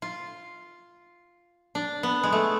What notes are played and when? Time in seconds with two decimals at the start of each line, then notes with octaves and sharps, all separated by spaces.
0.02 F4
1.75 D4
2.03 B3
2.24 G#3
2.32 A3